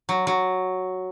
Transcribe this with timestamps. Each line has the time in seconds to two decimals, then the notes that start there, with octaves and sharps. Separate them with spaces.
0.09 F#3
0.27 F#3